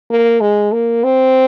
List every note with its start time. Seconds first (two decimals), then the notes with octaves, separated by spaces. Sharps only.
0.11 A#3
0.41 G#3
0.72 A#3
1.04 C4